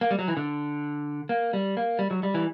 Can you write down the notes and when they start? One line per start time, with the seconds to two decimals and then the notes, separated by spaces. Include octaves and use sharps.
0.01 A#3
0.11 G3
0.19 F#3
0.28 E3
0.37 D3
1.29 A#3
1.53 G3
1.77 A#3
1.99 G3
2.11 F#3
2.23 G3
2.34 E3